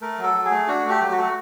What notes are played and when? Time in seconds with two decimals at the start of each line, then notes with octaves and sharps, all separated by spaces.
0.01 A3 A#4
0.18 F#3
0.23 A4
0.34 F#3
0.45 G#4
0.51 A3
0.67 D4 F#4
0.85 A3
0.90 G4
1.01 F#3
1.11 F#4
1.17 A3